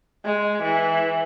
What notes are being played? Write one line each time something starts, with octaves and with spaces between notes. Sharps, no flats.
G#3
E3